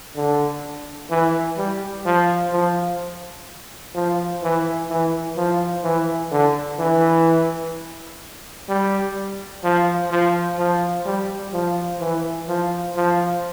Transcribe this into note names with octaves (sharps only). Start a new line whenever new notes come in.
D3
E3
G3
F3
F3
F3
E3
E3
F3
E3
D3
E3
G3
F3
F3
F3
G3
F3
E3
F3
F3